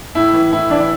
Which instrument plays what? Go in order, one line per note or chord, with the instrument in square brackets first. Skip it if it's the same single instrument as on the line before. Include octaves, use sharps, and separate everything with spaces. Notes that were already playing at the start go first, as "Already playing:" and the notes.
[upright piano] A2 E4
E3
A2 E4
E3 D4
E4